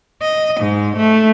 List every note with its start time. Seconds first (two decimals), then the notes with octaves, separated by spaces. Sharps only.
0.22 D#5
0.60 G#2
0.97 A3